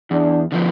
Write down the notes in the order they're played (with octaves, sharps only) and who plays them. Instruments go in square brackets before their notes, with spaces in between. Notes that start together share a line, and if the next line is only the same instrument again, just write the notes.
[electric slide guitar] E2 [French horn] D4
[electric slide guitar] D3 F3 B3